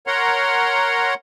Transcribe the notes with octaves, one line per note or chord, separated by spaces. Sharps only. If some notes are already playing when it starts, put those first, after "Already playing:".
A#4 C#5 F#5 A#5 C6